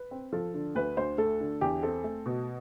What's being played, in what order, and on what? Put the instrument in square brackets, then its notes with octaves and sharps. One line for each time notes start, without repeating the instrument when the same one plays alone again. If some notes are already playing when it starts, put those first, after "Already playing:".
Already playing: [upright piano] B4
C4
F3 A4
D3
D2 B4
D2 C5
A3 A4
D3
E2 G4
C4 A4
A3
B2